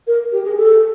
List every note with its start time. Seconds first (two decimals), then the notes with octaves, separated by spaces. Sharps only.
0.07 A#4
0.32 G4
0.45 G#4
0.57 A4